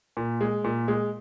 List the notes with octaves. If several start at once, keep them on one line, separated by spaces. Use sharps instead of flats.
A#2
G#3
A#2
G#3